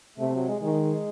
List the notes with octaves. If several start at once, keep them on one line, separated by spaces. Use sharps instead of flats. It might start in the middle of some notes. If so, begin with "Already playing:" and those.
C3 A3
F#3
G#3
D#3 G#3